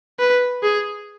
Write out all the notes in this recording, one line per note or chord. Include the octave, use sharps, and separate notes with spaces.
B4
G#4